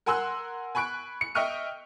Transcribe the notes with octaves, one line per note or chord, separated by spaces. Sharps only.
A#4 F#5 G#5 C6 E6 F#6
G#5 B5 C#6 F#6 D7
C#7
D#5 E5 G5 C#6 F6 D#7